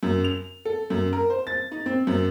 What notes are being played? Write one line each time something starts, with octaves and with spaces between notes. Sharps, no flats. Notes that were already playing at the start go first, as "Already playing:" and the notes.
F#2
F7
A4
F#2
A#4
C5
A6
D#4
C4
F#2